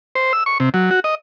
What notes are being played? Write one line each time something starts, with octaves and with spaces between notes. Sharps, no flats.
C5
E6
C#6
C3
F#3
F#4
D#5